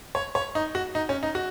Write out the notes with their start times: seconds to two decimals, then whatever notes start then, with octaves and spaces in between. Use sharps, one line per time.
0.15 C#5
0.35 C#5
0.55 D#4
0.75 F#4
0.95 D#4
1.09 C#4
1.23 D#4
1.35 F#4